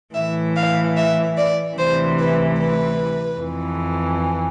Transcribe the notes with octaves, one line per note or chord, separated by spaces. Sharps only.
A2 E3 E5
F5
E5
D5
D2 C3 E3 C5
B4
B4
F2 E3